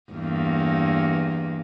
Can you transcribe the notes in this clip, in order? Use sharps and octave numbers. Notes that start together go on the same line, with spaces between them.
E2 G2 A#3